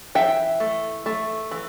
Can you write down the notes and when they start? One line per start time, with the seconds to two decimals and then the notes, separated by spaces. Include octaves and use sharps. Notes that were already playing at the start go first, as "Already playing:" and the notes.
0.15 E3 E5 G5
0.60 A3
1.06 A3
1.51 E3